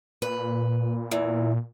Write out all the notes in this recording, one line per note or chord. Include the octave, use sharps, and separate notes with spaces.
A#2 B4
E2 E3